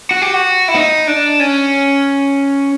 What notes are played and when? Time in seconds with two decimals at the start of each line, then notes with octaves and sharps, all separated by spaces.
0.11 F#4
0.22 G4
0.34 F#4
0.68 E4
0.75 D#4
1.07 D4
1.40 C#4